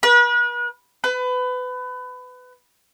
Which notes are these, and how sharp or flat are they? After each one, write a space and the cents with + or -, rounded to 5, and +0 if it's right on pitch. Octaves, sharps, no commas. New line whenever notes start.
B4 -40
B4 +25